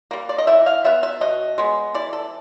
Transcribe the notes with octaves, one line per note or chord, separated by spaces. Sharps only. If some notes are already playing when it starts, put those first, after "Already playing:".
G3 A#3
D5
D#5
E3 E5
F5
G3 B3 E5
E5
B2 D#5
G#3 B3
E3 D5
A4